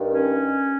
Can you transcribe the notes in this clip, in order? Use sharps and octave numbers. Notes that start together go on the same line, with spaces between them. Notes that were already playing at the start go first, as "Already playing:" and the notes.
Already playing: G2 D#3
C#4